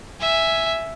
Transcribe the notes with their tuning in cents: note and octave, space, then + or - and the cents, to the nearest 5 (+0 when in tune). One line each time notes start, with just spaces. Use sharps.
E5 +0 G#5 +0